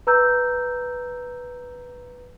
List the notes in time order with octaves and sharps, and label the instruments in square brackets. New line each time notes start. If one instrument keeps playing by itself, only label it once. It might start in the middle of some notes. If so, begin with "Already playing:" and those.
[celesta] B4 A#5 E6 G6